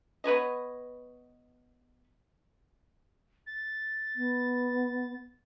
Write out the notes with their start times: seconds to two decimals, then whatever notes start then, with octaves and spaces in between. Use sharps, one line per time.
0.24 B3 B4 C#5 D#5
3.47 A6
4.16 B3